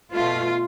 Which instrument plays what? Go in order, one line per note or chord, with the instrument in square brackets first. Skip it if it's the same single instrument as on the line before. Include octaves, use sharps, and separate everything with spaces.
[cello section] B2 A3 F4